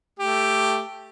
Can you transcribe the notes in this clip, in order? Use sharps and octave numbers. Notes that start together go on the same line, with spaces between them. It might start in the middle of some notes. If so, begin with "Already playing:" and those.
A3 G4